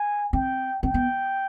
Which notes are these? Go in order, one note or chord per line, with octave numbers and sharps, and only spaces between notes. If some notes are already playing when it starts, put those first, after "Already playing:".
Already playing: G#5
C4 G5
C4 G5
B3